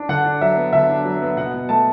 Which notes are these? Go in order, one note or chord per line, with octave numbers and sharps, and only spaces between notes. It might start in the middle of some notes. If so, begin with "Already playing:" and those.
Already playing: D4
D3 F#5
D4
F#3 E5
B3
D3 E5
D4
F#3
B3
B2 F#5
B2
A3 A5